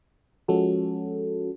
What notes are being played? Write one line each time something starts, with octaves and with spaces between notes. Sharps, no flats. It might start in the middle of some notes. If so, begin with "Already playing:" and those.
F3 G#3 C#4 F#4 A4